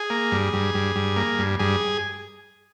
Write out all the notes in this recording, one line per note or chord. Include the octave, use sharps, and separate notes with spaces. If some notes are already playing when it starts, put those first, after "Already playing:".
Already playing: G#4
A#3
G2
G2
G2
G2
A#3
G2
G2 G#4